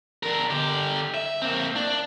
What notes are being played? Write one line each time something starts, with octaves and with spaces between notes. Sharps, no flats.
D4 A#4
D3 G4
E5
A#3 C4
D4